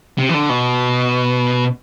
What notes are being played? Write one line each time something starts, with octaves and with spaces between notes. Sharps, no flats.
C3
E3
D3
B2